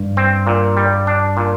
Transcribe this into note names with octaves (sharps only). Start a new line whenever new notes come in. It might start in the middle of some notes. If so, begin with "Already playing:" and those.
Already playing: G2
C4
A#2
G3
D4
A#2